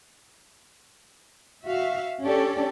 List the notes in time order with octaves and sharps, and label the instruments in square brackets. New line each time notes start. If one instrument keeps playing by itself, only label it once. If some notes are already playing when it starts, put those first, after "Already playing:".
[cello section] F#4 E5 F5
C#4 D4 G4 A4 D5